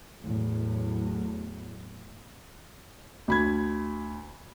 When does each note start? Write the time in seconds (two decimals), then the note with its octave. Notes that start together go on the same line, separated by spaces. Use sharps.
0.23 E2 A2 F#3
3.28 D2 B5 G#6